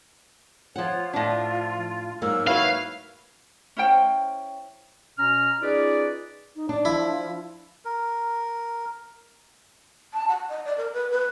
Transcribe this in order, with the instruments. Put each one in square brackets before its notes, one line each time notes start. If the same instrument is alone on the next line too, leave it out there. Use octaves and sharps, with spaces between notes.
[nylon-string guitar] F3 F#5 [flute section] F4 C#5
[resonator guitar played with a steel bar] A2 D4 [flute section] F4
[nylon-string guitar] G#2 F#3 A#3 [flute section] E6 F6
[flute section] E4 F#4 C#5 [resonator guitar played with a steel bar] B4 [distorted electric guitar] F5
[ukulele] C#4 E4 C5 G5
[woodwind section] B2 C#4 A#5 F6
C#4 D#4 F4 G#4 B4 D5
[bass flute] D#4
[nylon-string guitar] D4 [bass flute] D5
[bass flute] F3 [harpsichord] E4
[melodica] A#4
[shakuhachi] A5
F#5
D#5
D5
A#4
B4
B4